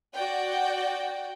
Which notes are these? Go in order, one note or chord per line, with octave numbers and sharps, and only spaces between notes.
F#4 D5 F#5 G5